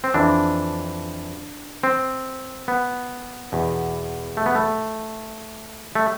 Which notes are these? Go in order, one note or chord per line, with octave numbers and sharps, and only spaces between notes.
C4
F2 E3 D4
C4
B3
E2 B2
A3
B3
A3
A3